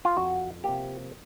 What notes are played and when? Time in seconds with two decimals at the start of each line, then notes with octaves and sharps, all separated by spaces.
0.05 F4
0.17 F2 F#4
0.64 C3 F3 A#3 G4